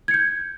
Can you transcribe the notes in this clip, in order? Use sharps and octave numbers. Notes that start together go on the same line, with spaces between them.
G6 G#6 C#7